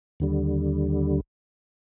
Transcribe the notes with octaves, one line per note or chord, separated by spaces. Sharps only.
D#2 D3 G3